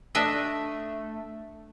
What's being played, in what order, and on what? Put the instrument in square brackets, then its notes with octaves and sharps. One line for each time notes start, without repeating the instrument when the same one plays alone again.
[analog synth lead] A3 [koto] D4 D#5 E5